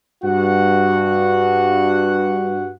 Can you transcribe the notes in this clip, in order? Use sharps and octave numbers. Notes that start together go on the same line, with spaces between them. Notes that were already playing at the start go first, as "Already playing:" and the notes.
G2 F#4 F#5